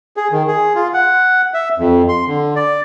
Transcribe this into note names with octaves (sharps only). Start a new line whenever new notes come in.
G#4
D#3
G#4
F4
F#5
E5
F2
C6
D3
D5